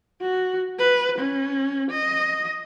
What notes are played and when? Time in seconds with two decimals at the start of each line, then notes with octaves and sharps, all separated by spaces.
0.21 F#4
0.79 B4
1.18 C#4
1.91 D#5